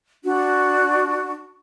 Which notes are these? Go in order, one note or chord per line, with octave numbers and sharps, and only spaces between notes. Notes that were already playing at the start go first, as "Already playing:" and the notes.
D4 F#4